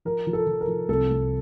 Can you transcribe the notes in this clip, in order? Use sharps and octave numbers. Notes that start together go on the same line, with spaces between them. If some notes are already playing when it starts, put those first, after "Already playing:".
F3 A#4
F3
A4
F3
A#4
F3
C2 A4
C2